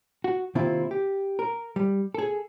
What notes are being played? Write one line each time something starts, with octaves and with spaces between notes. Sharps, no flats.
F#4
C3 D#3 A#3 C4 E4 F4
G4
A#4
G3
G#4 A4